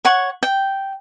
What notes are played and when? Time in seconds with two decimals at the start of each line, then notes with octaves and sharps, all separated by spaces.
0.05 C#5 F#5 C#6
0.43 G5